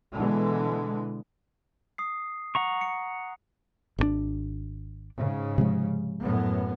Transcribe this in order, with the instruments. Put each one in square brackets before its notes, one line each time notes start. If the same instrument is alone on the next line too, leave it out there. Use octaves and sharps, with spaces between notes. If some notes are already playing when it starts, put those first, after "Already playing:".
[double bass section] B2 D3 E3 G#3
[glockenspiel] D#6 C7
[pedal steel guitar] F#5 A#5 C#6
[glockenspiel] C#7
[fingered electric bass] G#1 B2 D4
[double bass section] G#2 C#3
[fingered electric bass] C3 F3 G#3
[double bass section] F#2 A2 B3